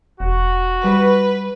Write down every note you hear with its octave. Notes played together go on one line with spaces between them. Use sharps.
E1 F#4
G3 B4